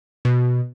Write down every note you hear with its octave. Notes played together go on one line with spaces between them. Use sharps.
B2